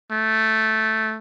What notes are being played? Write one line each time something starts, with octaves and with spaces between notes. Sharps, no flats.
A3